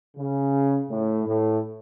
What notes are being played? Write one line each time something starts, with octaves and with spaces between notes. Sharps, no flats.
C#3
A2
A2